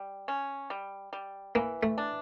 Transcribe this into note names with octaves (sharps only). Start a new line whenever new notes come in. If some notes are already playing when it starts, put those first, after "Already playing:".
Already playing: G3
C#4
G3
G3
E3 A#3
A3
D4